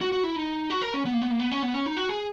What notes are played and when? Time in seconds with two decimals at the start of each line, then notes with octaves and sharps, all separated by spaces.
0.01 F#4
0.12 F#4
0.24 E4
0.36 D#4
0.70 F#4
0.82 A#4
0.94 C#4
1.05 B3
1.13 A#3
1.22 B3
1.30 A#3
1.39 B3
1.51 C#4
1.63 B3
1.74 C#4
1.86 D#4
1.97 F#4
2.09 G#4